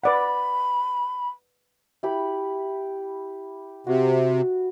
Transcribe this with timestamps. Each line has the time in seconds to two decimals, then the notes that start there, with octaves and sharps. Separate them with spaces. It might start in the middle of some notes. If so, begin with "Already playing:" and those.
0.04 B4 D5 F#5 B5
2.03 E4 G4 B5
3.87 C3 F#4